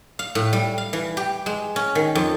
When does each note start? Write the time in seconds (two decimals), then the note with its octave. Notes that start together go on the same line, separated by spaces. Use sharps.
0.19 F5
0.35 A2
0.53 G3
0.78 F5
0.93 E3
1.17 G4
1.46 G#3
1.76 C#4
1.95 D#3
2.15 F2